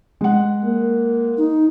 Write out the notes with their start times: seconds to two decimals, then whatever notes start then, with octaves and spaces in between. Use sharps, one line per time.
0.21 G#3 F#5
0.64 A#3
1.37 D#4